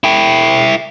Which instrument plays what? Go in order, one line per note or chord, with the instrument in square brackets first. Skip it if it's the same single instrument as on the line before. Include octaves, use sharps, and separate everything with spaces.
[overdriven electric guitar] E4 G5